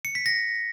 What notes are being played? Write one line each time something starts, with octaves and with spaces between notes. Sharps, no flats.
C#7
B6
A#6